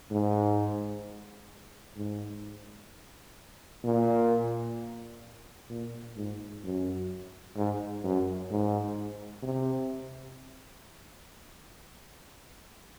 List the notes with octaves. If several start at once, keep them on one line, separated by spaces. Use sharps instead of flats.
G#2
G#2
A#2
A#2
G#2
F#2
G#2
F#2
G#2
C3